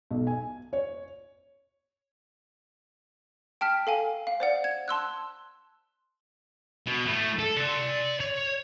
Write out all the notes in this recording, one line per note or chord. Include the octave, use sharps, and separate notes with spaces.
B1
G#5
C#5
G5 A5 F6 B6
A4 F5 G#5
F5
C5 D5 F#5
G#6
A5 C6 E6 F#6
B2
A3 E4
A4
D5 C6
C#5